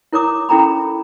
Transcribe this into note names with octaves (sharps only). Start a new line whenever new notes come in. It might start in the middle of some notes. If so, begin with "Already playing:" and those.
E4 A#4 C#5 A#5 D6 D#6
C#4 E4 A4 G5 A#5 B5